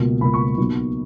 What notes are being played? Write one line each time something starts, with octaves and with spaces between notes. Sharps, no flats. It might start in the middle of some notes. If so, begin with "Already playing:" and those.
Already playing: C#2 B2 A#3
C#2 B2 A#3 B5
C#6
B1 B2 A#3